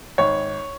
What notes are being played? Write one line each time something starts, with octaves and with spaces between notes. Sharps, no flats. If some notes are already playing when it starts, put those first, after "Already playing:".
G#1 C#5